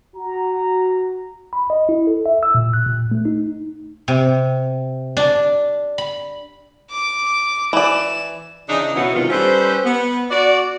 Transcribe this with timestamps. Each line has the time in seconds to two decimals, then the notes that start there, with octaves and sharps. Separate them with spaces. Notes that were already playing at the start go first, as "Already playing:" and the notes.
0.16 F#4 A#5
1.53 B5
1.70 D#5
1.89 E4
2.07 A4
2.26 E5
2.43 E6
2.55 A#2
2.73 F#6
2.87 A#2
3.12 A3
3.25 D#4
4.08 C3
5.17 D4
5.98 B5
6.91 D6
7.73 E3 D5 E7
8.69 C#3 E3 D4 D#4
8.95 B2 F#3 B3 C#4 E4 F#4
9.15 G#2 C3 D#3 E3 F4
9.30 G3 C#4 A4 B4 C5
9.85 B3
10.30 F#4 D5